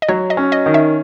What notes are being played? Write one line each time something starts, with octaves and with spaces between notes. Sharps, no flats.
D#5
F#3 C#5
D#5
C#4
D#5
D#3
E5